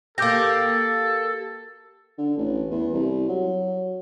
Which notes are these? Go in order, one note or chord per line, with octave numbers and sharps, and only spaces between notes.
A#3 G4 A4 D6 G6 A#6
D3
A1
E2
C2
F#3